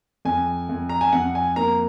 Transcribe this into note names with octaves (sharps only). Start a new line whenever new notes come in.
F2 G#5
F2
A#5
G#5
F2 F#5
G#5
A#3 A#5